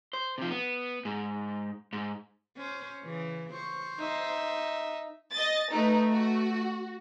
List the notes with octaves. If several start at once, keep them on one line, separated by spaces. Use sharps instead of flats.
C5
C3 F3
B3
G#2
G#2
C#4 C5
C#3 E3
C5 C#6
D#4 E5
D#5 A6
A3 D#4 B4
F#4